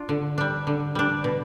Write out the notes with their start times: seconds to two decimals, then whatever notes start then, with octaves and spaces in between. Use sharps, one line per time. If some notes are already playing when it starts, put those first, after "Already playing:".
Already playing: D4 F4
0.09 D3
0.38 G3 D4
0.67 D3
0.95 G3 D4
1.24 B2